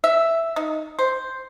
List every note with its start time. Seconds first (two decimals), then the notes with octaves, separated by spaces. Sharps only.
0.04 E5
0.56 D#4
0.99 C5